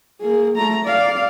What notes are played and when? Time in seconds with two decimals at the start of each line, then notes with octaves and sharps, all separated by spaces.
0.21 A#3 G#4
0.56 A3 A#5
0.85 D5 F5